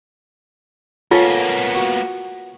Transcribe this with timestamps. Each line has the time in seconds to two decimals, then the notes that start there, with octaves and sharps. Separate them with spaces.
1.11 A#3 B3 C#4 F4 A4
1.75 F#4